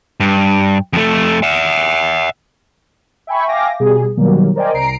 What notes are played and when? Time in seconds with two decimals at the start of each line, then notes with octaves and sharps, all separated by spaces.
0.20 G2
0.93 F2 A3
1.43 E5 F#5
3.27 E5 G5 G#5 B5 C#6
3.48 E5 F5 G5 G#5 D6 A#6
3.80 B2 G3 G#4
4.17 B2 D#3 F#3 G3 A#3
4.56 A#4 C5 D5 D#5 G5 G#5
4.74 C2 A#5 C7 D7